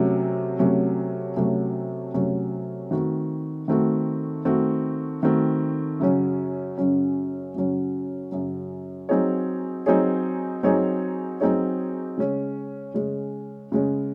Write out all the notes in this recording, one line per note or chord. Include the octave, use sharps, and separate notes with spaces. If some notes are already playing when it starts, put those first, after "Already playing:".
Already playing: C3 F#3 A3 C#4
C3 F#3 A3 C#4
C3 F#3 A3 C#4
C3 F#3 A3 C#4
D#3 A3 C4 F#4
D#3 A3 C4 F#4
D#3 A3 C4 F#4
D#3 A3 C4 F#4
F#2 C#3 F#3 C#4
F#2 C#3 F#3 C#4
F#2 C#3 F#3 C#4
F#2 C#3 F#3 C#4
F#3 C4 D#4 G#4 C#5
F#3 C4 D#4 G#4 C#5
F#3 C4 D#4 G#4 C#5
F#3 C4 D#4 G#4 C#5
C#3 G#3 C#4
C#3 G#3 C#4
C#3 G#3 C#4